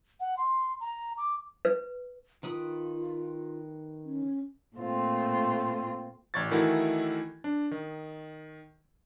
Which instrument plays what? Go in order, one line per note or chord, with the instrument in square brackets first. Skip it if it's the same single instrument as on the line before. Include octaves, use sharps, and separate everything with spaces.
[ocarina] F#5
C6
A#5
D6
[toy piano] B4
[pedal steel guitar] D#3 B4 D#6 [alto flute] F4
[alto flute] C#4
[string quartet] A#2 A3 C4 F4
[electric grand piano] A1 D5 C#6 G#6 A6
D#3 E3 A3 E4 F#4 A#4
D4
D#3